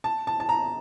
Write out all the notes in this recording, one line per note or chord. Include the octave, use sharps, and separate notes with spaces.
A5
A5
A5
A#5